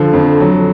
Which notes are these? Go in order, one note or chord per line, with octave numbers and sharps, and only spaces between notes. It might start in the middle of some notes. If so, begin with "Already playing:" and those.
Already playing: D3 F3
F2
F#3